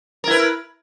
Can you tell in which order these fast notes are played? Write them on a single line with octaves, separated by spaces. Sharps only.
A#4 E4 B4